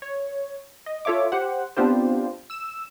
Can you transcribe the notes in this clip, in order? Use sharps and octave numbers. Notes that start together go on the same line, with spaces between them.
C#5
D#5
F4 A4 C#5 E5 D6
G4 C5 F#5
B3 C4 D4 F4 G4 C5
E6 E7